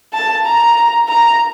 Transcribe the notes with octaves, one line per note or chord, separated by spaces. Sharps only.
A5
A#5
A#5